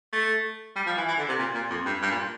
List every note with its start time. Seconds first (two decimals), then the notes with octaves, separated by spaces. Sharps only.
0.13 A3
0.76 G3
0.86 F3
0.97 E3
1.08 E3
1.18 D3
1.29 C3
1.39 A#2
1.55 A#2
1.70 F2
1.86 G2
2.02 G2
2.12 A#2